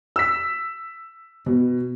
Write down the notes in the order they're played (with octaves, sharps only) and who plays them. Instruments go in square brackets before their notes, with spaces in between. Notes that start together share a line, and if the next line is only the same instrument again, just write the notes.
[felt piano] E6 B6
B2